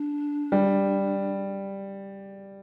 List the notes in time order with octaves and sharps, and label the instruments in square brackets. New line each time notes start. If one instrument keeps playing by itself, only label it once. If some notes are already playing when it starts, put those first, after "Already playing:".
Already playing: [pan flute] D4
[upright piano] G3